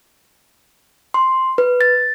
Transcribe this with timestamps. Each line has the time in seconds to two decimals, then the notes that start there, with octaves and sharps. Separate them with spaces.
1.14 C6
1.58 B4
1.81 A6